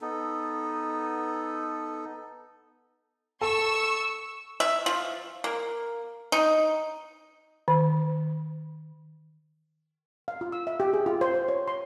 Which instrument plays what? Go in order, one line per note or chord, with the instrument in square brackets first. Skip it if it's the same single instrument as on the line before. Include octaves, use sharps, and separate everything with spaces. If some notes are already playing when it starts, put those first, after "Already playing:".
[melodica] B3 D#4 A4
[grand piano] A4 [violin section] C#6 E6
[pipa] E5
F3
A#3
D#4
[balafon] D#3
[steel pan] F5
F4
E6
E5
G4
G#4
F4
C5
C5
C#5
C6